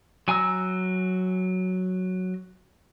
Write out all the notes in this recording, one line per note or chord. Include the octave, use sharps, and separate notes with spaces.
F#3 G#5 A#5 E6